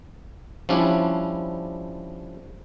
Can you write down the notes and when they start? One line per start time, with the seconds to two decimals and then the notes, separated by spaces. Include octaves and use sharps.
0.69 F3 G3 C#4 D4 E4